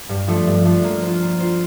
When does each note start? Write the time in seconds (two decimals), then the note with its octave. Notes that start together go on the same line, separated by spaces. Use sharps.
0.09 G2
0.28 F3 A3 D4
0.47 G2
0.65 F3 A3 D4
0.84 A#3
1.02 F4 C5
1.22 A#3
1.40 F4 C5